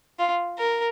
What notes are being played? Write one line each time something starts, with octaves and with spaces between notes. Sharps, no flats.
F4
A#4